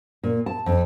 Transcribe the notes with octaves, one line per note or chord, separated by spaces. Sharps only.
A#2
A5
F2